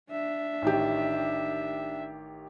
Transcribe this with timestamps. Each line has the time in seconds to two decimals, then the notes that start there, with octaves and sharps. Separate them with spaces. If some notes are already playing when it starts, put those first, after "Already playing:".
0.10 D4 E5
0.62 A1 D#3 G4